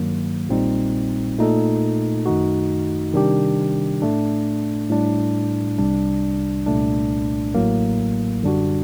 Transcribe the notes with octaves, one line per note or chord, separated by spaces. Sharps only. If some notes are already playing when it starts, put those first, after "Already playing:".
Already playing: G2 D#3 F#3 A#3
A#1 A#2 G3 C4 D#4
A#2 A3 D#4 A4
F#2 D#3 A3 D#4 F#4
C3 D#3 G3 D4 G4
A2 A3 D4
A2 G3 D4
C2 C3 G3 D4
C2 A#2 A3 D4
A1 A2 F#3 A#3
F#2 D3 G3 D4 F#4